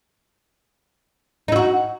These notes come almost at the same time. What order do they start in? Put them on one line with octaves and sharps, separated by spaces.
D#4 E4 F#4